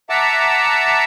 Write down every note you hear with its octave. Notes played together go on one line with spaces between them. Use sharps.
E5 F#5 A5 A#5 D6 E6